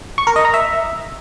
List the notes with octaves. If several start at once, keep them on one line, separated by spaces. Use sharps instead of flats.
C#6
A#4
D#5
A#5
E5